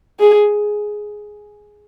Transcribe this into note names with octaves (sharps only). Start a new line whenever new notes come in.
G#4